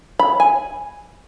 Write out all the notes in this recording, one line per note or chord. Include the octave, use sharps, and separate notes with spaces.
B5
G#5